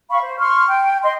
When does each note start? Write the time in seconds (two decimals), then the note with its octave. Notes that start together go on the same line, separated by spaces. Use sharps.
0.10 F5 B5 C#6
0.22 C5
0.39 C6 C#6 F6
0.68 G5
1.03 D#5 C6